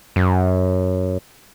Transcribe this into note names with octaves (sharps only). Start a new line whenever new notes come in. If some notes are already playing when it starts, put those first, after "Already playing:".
F#2